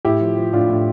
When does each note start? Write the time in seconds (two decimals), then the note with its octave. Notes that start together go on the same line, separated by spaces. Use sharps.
0.05 A2 E4 G4
0.21 F3
0.37 F3
0.53 A2 D4 F4
0.69 A2